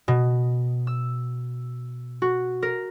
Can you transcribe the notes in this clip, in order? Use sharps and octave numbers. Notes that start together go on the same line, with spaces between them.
B2
E6
F#4
A#4